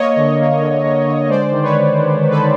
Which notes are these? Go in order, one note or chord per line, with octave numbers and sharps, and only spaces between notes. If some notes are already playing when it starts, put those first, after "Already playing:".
Already playing: A#3 C#5 D#5
D3
A#3
D3
D3
D3
G#3 C5 D5
D#3
B4 C#5
D#3
D#3
D#3
A4 B4
D#3